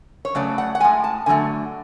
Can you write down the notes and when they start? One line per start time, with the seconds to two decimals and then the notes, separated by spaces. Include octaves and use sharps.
0.25 C#5
0.35 C#3 F#3 A3 D5
0.58 F#5
0.75 F#5
0.80 A2 G#3 G#5
1.04 A5
1.26 D3 F#3 A3 G#5